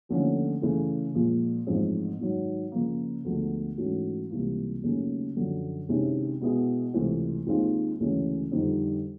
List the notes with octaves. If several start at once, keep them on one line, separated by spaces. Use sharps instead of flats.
D#2 D3 F3 A3 C#4
C#3 E3 A3
A#1 A#2 F3 G#3
A1 G#2 F3 G#3 C4
G#2 D#3 F#3
C#3 F3 A#3
D2 D3 F3 G#3 B3
G#2 E3 A3 C#4 F#4
C#2 C3 E3 G3 A#3
D#2 C#3 F#3 A3 C#4
F#2 D3 F3
C3 D#3 G#3 C#4 E4
B2 G#3 B3 E4 G#4
C#2 C3 E3 A3 C4
D#2 D#3 G#3 C4 F4
D2 C#3 E3 G#3 C#4
F2 D3 G3 C4 D#4